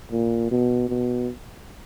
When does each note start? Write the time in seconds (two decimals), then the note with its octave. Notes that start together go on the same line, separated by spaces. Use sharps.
0.12 A#2
0.51 B2
0.89 B2